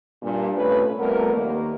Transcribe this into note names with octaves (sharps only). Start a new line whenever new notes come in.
G2 A#2
C3 A3 C#4 F4 B4
F2 G3 A3 B3 A#4
D#2 A#3